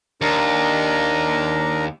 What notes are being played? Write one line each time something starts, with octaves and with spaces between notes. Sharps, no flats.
D#2 D4 A#4 A#5